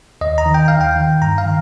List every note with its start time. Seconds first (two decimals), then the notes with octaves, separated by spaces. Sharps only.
0.21 D#2 D#5
0.38 A#5
0.46 D#3
0.54 G5
0.68 D#2 F5
0.81 G5
0.96 D#3
1.22 G2 A#5
1.38 F5
1.46 D#3